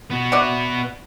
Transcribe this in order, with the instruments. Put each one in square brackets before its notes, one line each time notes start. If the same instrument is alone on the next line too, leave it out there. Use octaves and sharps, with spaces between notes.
[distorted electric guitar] B3 F#4
[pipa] D5 E5 F#5